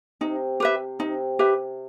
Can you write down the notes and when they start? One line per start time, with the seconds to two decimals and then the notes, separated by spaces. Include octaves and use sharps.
0.21 C3 D#4
0.60 G4 B4 E5
0.99 C3 D#4
1.39 G4 B4 E5